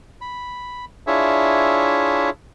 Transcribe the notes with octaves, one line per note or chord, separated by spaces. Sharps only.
B5
D4 E4 F4 G#4 C#5 E5